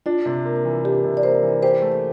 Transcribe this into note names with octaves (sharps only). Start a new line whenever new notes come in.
D4 F4
C3
A#3
E3
D4 G4
C3
D5
A#3 C5
E3
G4 C5
A3